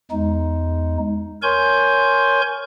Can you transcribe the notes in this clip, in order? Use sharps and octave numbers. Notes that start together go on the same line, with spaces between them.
E2 G#3 D#4
A#4 C#5 G#5 C6 C#6 G6